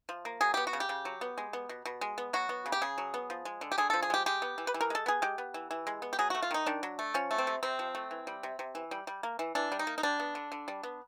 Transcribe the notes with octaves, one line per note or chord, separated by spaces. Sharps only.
F3
A#3
F#3 G#4
B3 G4
F#4
C#3
G4
C#3
F#3
B3
G#3
B3
B2
B2
G#3
B3
F#3 F#4
B3
C#3
G4
C#3 G#4
F#3
B3
F3
G#3
D3
G4
D3 G#4
F3 A4
G#4
G#3 G4
G#3 G4
B3
E3
B4
E3
A#4
G#3 A4
B3 G#4
G#3 G4
B3
E3
E3
G#3
B3
G4
F#3 G#4
A3 F#4
F4
D#3 D#4
D#3 D4
F#3
A3
F3 C#4
A3
C4
C3
C3 C4
F3
A3
E3
G3
C3
C3
E3
G3
G3
A#3
E3
E3 D4
G3
D#4
A#3
D#4
G3 D4
B3
D3
D3
G3
B3